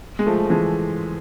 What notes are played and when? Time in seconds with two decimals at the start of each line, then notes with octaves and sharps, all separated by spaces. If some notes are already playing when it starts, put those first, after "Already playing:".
0.19 G#3
0.26 F3 A3
0.44 F3
0.50 E3 G#3